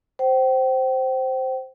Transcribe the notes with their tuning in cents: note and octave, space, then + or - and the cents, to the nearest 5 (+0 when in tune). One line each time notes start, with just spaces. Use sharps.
C5 +0 G5 -35